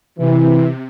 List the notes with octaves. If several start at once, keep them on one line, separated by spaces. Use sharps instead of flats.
C3 E3